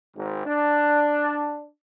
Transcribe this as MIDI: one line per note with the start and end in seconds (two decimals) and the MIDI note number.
0.15 0.44 32
0.45 1.67 62